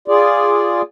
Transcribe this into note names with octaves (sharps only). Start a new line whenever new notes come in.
F4 G#4 D5